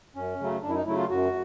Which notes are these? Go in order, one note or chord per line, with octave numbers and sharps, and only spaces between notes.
F#2 C#4
C#3 F#3 A3
F#2 D4
E4
D#4
C#3 F#3 A3 E4
F4
F#2 F#4